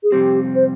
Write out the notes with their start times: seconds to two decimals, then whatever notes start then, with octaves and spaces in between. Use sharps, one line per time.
0.03 G#4
0.12 F2 C3 G3 C4 G4
0.55 C5